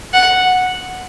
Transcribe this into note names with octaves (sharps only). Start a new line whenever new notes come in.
F#5